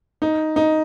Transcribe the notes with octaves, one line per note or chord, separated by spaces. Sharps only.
D#4
D#4